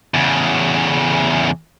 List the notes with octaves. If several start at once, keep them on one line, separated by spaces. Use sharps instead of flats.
E2 C#3